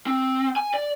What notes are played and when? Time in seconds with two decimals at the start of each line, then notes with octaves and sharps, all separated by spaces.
0.07 C4
0.56 G#5
0.74 D5